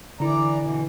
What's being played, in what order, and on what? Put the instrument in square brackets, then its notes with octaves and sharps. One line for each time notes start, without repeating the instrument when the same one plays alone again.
[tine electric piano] D3 E4 [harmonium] E3 D5 A#5
[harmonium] B2 E3